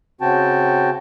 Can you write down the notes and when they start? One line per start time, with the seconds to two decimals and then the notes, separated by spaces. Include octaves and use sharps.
0.21 C#3 C4 F#4 G5 A5